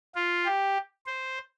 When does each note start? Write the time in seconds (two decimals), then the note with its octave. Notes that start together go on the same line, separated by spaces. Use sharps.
0.15 F4
0.46 G4
1.06 C5